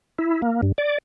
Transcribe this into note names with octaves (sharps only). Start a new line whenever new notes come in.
E4
A#3
G2
D5